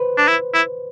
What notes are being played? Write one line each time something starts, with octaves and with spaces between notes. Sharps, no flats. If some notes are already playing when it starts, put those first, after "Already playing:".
Already playing: B4 C5
D4
E4
E4